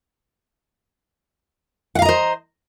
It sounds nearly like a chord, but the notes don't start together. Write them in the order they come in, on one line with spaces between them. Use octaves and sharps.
F#5 F5 A#5 D#5 C5